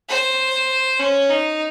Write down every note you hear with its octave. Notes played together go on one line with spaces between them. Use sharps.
C5
C#4
D#4